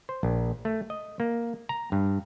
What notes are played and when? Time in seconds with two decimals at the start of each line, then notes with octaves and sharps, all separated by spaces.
0.09 C5
0.23 A#1
0.65 A3
0.90 D#5
1.20 A#3
1.69 A#5
1.92 G2